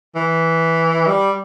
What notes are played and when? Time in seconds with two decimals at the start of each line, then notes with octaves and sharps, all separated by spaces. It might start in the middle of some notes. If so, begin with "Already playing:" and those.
0.15 E3
1.07 G3